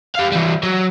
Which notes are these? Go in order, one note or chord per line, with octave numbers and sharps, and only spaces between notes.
G4 F5
E3 G3
F#3